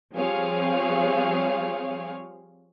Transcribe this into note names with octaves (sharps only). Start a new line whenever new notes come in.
F3 G3 C4 G#4 C#5 F5